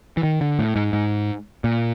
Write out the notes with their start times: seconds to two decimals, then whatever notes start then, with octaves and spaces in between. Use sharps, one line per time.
0.17 E3
0.23 D#3
0.41 D3
0.59 A2
0.76 G#2
0.93 G#2
1.64 A#2